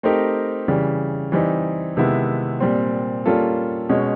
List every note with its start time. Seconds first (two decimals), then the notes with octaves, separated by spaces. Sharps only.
0.03 A3 C4 D#4 G4 A#4
0.68 C#3 E3 G3
1.32 E3 G3 C4 D#4
1.97 C3 D#3 G#3 B3 E4
2.60 A#2 G3 C4
3.25 G3 A#3 C#4 F4 A4
3.89 B2 G#3 C#4